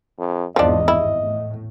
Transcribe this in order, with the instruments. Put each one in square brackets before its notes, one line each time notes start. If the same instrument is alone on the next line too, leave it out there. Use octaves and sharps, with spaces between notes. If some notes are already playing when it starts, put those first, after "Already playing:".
[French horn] F2
[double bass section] G#1 E2 G#2 [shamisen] F3 D4 [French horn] D#5
[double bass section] G2 [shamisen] E4
[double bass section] A2